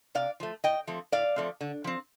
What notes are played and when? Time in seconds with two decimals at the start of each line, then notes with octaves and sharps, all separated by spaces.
0.15 C3 D5 F5
0.40 F3 A3
0.64 A2 D#5 G5
0.87 F3 A3 C4
1.12 A2 D5 F5
1.36 F3 A3 C4
1.61 D3
1.84 F3 C4